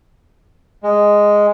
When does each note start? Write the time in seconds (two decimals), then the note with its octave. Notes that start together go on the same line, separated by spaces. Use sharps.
0.83 G#3